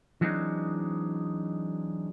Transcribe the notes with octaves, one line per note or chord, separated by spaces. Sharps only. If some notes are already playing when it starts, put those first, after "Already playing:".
E3 F#3 G#3 C4 D4 D#4